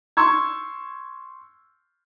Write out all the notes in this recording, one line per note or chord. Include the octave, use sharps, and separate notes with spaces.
C6 C#6 E6 G#6